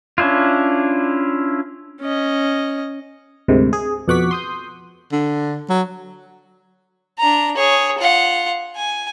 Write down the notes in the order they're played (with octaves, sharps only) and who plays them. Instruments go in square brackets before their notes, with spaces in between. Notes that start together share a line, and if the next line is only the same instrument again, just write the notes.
[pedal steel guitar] C#4 D4 E4 F4
[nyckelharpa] C#4 D#5
[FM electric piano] D2 G#2 C3 D#3
G#4
F2 B2 F#5 C#6 D6 B6
C6 D#6 G6
[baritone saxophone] D3
F#3
[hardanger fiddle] D4 A#5
G#4 C#5
F4 F#5
G#5